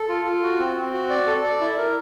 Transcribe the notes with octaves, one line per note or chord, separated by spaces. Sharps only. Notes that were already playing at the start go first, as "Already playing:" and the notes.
Already playing: A4
F4
F4
F#4
C4
C4
F#4
D5
A4
D5
E4
A#4